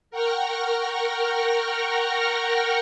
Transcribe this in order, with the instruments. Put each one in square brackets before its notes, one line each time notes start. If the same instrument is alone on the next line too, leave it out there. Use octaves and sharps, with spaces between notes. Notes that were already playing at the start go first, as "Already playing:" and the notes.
[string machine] A#4 F#5 G5 C#6 F6 A#6